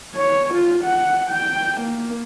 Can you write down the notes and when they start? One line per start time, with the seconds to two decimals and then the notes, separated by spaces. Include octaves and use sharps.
0.15 C#5
0.54 F4
0.84 F#5
1.30 G5
1.81 A#3